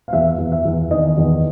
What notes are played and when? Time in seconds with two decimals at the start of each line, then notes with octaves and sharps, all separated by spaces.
0.08 F5
0.13 E2 E5
0.38 E2
0.52 E5
0.65 E2
0.91 D#3 D#5
1.17 E2